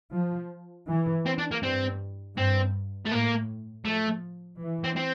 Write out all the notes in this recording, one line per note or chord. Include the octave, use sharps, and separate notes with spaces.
F3
E3
C4
D4
A#3
G2 C4
G2 C4
A3
A2 A#3
F3 A3
E3
C4
C4